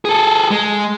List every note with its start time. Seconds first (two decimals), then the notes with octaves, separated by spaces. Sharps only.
0.05 G#4 A4
0.51 G#3